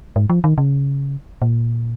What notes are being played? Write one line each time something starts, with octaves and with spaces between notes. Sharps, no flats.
G#2
F3
D#3
C#3
A#2